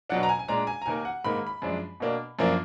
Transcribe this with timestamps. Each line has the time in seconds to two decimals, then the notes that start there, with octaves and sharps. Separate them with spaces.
0.10 B2 F#3 D4 F#5
0.23 A#5
0.29 G#5
0.39 G#5
0.48 A#2 G#3 D4 A#5
0.67 G#5
0.82 A#5
0.86 D#2 D#3 A#3 G#5
1.05 F#5
1.24 G#2 D#3 A#3 B5
1.47 B5
1.62 F#2 F3 G#3 D4
2.00 B2 A#3 D4
2.39 F#2 F3 A#3 D4